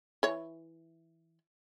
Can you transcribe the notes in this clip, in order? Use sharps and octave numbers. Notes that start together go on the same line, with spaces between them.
E3 C#5